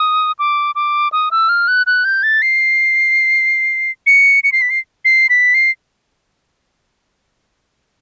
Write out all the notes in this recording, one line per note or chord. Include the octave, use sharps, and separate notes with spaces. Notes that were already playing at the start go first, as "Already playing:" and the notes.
Already playing: D#6
D6
D6
D#6
E6
F6
F#6
F#6
G6
A6
C7
C#7
C#7
C7
B6
C7
C7
B6
C7